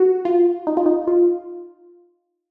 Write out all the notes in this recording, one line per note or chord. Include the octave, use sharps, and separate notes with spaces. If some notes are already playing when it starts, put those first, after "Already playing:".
Already playing: F#4
F4
D#4
F4
D#4
F4